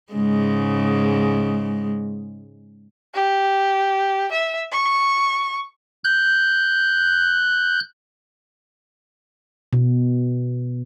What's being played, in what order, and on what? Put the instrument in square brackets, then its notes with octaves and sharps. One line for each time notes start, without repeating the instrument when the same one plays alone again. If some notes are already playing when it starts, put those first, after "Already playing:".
[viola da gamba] G#2 C#3 G#3
[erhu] G4
E5
C#6
[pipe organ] F#6 G6
[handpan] B2